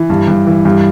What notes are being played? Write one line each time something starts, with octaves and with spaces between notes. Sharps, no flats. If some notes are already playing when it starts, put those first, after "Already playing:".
Already playing: E3
G2
G2
E3
G2